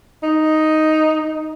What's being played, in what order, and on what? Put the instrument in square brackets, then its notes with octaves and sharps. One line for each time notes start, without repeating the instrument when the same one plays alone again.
[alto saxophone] D#4